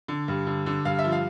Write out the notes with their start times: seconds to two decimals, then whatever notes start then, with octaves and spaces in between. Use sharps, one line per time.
0.08 D3
0.28 G2
0.47 D3
0.66 D3
0.85 G2 F5
0.99 E5
1.04 F3
1.12 F5